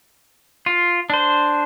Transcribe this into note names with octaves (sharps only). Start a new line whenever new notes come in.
F4
D4 C5